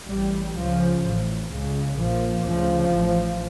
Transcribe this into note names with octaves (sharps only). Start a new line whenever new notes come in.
A1 A2 G3
C#2 C#3 F3
A1 A2
C#2 C#3
A#1 A#2 F3
D2 C#3 F3
A1 A2